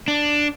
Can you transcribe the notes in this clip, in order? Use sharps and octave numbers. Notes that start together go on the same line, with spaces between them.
D4